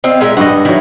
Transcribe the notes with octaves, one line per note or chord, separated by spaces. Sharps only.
C4 D#5 F5
A#2 G#3 E5
G2 G3 D#5 F#5
D#3 F#3 E4 F5